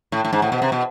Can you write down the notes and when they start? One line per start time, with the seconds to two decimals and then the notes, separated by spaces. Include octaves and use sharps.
0.12 A2
0.25 A2
0.33 G#2
0.42 A2
0.52 B2
0.62 C3
0.72 B2